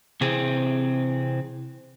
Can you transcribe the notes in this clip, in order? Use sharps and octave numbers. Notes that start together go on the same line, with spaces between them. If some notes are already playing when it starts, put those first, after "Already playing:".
C3 E3 C4 G#4